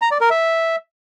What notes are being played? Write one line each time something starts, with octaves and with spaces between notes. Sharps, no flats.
A#5
D5
A#4
E5